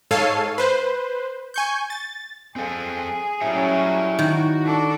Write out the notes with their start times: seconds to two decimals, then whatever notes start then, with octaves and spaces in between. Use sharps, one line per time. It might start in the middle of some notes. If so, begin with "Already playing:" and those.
0.11 G#2 A4 C#5 F5 C7 D#7
0.58 B4 C5
1.54 G#5 C#6 G6
1.90 A6
2.56 C4 G#4 A4
3.41 F#3 G3 C#4 E4 C#5 E5
4.19 D#3 F#4
4.64 D4 A4